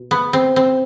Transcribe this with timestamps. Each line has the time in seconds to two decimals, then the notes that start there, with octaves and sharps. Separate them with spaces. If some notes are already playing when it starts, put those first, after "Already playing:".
Already playing: B2
0.11 B3
0.33 C4
0.56 C4